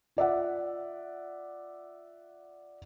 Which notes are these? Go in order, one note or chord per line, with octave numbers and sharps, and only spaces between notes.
F4 D5 E5 F#5